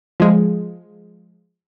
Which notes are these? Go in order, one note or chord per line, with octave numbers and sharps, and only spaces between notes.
F3 G#3